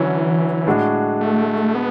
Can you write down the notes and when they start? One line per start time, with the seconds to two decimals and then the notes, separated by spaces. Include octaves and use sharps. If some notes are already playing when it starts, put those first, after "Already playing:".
Already playing: D3 E3 F#3 C#4 E4
0.67 A2 G#3 D4 F#4
1.21 A3
1.75 B3